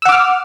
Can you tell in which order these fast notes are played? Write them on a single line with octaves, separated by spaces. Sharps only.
E6 F#5 D6 F6